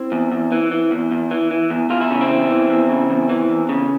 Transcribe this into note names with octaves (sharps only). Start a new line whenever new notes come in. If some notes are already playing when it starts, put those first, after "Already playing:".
Already playing: C4 E4
E2
E2
E3
E3
E2
E2
E3
E3
E2
E2 F4
E4
C#3 C#4
C4 E4
E2
E3
E2
C#3
E2
E3
E2
C#3